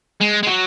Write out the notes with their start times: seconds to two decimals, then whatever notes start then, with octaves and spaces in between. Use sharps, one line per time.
0.21 G#3
0.43 G#3
0.47 F#3